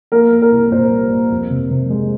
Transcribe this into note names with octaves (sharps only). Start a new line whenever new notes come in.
A#3 A#4
A#3
A#4
C2
A#2 C5
G3
A#3
F2
C3
C3
G#3